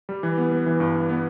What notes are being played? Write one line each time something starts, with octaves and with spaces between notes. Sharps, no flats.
G3
E3
B3
B3
E3
G2
G2
B3